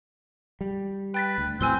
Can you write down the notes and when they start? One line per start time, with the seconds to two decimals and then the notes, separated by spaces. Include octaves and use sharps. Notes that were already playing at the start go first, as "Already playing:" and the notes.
0.61 G3
1.14 B4 G5 A6 B6
1.38 D2
1.61 A1 A2 F#3 C4 G#5 E6 G7